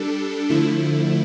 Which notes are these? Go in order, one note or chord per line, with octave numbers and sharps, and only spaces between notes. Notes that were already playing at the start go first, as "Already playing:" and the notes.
Already playing: G3 D4 A4
D3 F3 A3 E4